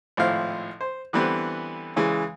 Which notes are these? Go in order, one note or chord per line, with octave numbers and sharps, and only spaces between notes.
G#1 A2 F3 E4 F5
C5
D3 E3 G3 B3 C4
C#3 E3 G#3